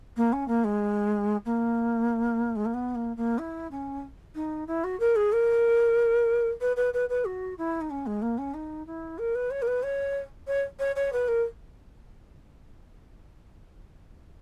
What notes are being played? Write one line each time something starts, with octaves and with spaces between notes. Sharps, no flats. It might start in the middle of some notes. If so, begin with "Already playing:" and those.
A#3
C#4
A#3
G#3
A#3
G#3
A#3
B3
A#3
A#3
E4
C#4
D#4
E4
F#4
A#4
G#4
A#4
B4
B4
B4
B4
F#4
E4
D#4
C#4
G#3
A#3
C#4
D#4
E4
A#4
B4
C#5
A#4
B4
C#5
C#5
C#5
C#5
B4
A#4